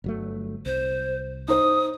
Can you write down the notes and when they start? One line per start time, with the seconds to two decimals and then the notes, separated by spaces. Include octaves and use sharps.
0.04 G1 F#3 A3
0.66 C2 C5
1.48 D#4 C5 D#6